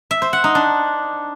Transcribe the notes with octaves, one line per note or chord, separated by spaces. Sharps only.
E5
C5
F#5
D#4
D4